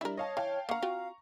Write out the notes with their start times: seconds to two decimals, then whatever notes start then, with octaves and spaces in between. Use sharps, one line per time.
0.01 G3 D4 E4 A#4 E5
0.17 C#5 D#5 F5 A5
0.37 E3 F5 G5 A5
0.69 A#3 F5 F#5 A#5 C#6
0.82 C4 F4 F#4